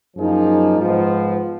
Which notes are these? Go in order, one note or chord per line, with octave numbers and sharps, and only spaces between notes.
F#2 F3 A#3 D#4 G#4
G#2 F3 B3 F4